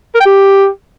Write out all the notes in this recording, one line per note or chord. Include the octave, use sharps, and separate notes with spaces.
A#4
G5
G4